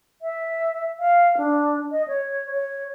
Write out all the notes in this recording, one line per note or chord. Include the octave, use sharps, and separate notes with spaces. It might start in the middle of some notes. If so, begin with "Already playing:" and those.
E5
F5
D4
D#5
C#5
C#5